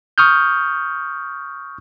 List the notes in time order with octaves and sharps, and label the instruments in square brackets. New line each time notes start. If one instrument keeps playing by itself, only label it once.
[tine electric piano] C#6 D#6 F6 G6